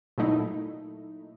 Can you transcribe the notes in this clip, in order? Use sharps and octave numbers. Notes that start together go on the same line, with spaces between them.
A#2 F#3 A3 D#4 E4